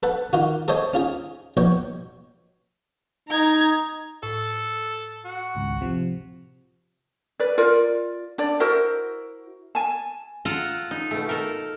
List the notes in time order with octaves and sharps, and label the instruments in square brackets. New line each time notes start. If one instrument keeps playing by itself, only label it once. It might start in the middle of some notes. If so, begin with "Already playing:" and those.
[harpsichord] A4 B4 F#5
D#3 F4 F#4
G#4 A4 C5 C#5 D#5 G#5
C#4 F4 G#4
A#1 B2 C#5 G5
[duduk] D#4 [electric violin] A#5 G#6
[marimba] A2 [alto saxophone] A4
[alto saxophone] F#4
[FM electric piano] G#1 C#2
C3 F3
[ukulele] B4 D5
F4 A#4 D5
D4 D5
E4 F#4 A#4 C5
G#5 A5
[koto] F4 A4 F#5 A#5
D#4
B2 A3
A4 A#4